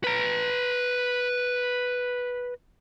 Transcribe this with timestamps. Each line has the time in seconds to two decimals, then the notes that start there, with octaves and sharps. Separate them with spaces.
0.04 B4 A#5